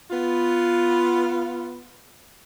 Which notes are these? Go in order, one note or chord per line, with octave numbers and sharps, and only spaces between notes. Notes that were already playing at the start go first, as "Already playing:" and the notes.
B3 F4